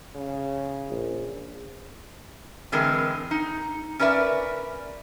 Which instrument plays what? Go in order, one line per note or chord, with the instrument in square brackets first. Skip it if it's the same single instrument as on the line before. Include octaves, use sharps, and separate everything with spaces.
[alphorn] C#3
[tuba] A#1
[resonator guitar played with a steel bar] D3 E3 G#3 C4 A#4
D#4
C#4 A#4 B4 D5 E5